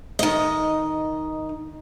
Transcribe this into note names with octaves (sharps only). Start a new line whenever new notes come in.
D#3 D#5